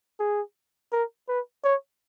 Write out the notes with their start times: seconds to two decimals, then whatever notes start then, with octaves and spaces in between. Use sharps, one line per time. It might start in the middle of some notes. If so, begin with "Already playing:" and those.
0.19 G#4
0.92 A#4
1.28 B4
1.64 C#5